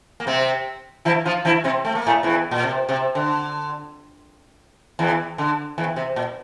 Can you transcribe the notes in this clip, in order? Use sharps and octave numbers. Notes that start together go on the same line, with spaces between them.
A#3
C3 C4
E3 E4
F3 F4
E3 E4
C3 C4
A3
A#3
A2 A3
E2 E3
A#2
C3
C3
D3
E2 E3
D3
E2 E3
C3
A#2